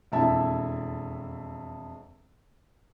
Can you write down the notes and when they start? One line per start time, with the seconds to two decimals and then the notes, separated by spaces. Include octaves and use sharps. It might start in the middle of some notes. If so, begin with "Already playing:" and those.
0.12 E1 F2 E4 E5 A5